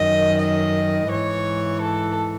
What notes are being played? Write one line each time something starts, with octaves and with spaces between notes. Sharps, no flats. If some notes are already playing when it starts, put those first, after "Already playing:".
Already playing: F#2 D#3 D#5
D#5
G#2 E3 C#5
A4